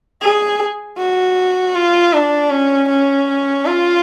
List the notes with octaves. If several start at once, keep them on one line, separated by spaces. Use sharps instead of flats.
G#4
F#4
F4
D4
C#4
C#4
F4